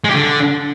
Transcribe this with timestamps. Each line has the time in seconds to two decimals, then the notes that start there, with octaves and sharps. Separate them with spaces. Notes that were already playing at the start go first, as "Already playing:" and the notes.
0.04 G#3
0.09 G4
0.14 D3